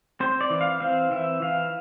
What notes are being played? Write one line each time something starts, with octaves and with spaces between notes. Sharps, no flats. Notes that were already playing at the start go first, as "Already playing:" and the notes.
C4 C5
D5
E3
F5
C4 F5
E3 E5
E3 F5